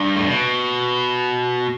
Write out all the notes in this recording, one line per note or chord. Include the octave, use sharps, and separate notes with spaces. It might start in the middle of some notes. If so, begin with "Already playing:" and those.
Already playing: G2
A2
B2